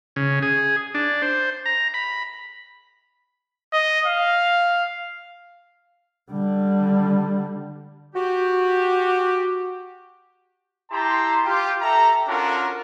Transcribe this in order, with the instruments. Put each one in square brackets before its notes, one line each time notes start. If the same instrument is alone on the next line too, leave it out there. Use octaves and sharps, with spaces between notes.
[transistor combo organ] C#3
G#4
D4
C5
A#5
B5
[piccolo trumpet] D#5
F5
[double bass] D3 G3
[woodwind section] F#4 G4
[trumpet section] E4 G4 A5 A#5 C6
F4 G4
G4 A4 E5 A#5
C#4 D4 F4 F#4 A4 A#4